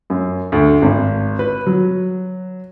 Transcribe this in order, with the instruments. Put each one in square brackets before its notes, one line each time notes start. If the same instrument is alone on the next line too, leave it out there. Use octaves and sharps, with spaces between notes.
[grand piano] F#2
D2
G#1
B4
F#3